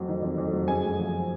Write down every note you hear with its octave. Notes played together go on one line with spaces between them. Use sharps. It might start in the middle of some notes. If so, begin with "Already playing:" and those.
Already playing: F2 F#3
D#3
F2
F2
F#3
F#2 G#4 G#5
G#3
F3